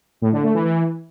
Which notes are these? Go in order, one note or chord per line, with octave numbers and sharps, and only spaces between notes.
A2
D3
A3
E3
E3